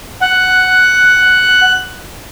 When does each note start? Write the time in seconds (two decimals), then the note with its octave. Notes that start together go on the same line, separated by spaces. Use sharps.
0.21 F#5 F#6